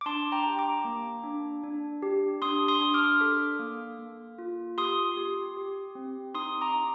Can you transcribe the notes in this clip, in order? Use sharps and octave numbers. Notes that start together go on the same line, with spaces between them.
D6
D4 A5 C6
G5 A#5
G4
A#5 D6
A#3
D4
D4
G4
D4 C6 D#6
C6 D#6
D4
D6 F6
A4
A#3
A#3
F4
G4 C6 D#6
G4
G4
C4
D#4 C6 D#6
A#5 D6
D#4